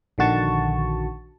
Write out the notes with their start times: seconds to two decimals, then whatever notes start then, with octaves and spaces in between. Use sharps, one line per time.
0.18 A#1 D3 D#3 F#4 A5 C#6